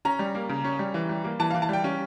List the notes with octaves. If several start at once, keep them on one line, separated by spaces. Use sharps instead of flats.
C#4 A#5
G3
A#3
C#3
C#4
G3
E3
G3
A#3
E3 A5
E3 F5
A5
G3 G5
C#4